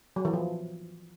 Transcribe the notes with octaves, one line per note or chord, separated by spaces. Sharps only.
F#3
E3
F3